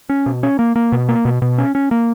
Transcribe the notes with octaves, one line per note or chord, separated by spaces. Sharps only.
C#4
B2
C#4
A#3
A#3
B2
A#3
B2
B2
C#4
C#4
A#3